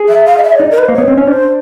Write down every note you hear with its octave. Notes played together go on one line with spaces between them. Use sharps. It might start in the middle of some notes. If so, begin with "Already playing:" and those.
Already playing: G#4
E5
F5
D#5
E5
C#5
D#4 D5
A#4
B4
C5
A#3
B3 C#5
C4
C#4
D4 C5